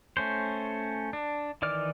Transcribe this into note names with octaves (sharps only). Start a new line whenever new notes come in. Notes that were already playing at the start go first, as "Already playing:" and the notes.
A3 C#4 C5
D4
D#3 E3 D5 D6 F6